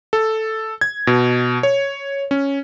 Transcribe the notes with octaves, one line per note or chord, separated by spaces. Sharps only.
A4
G#6
B2
C#5
C#4